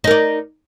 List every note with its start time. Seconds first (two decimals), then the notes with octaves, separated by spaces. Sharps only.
0.04 D#4
0.07 A#4
0.11 D5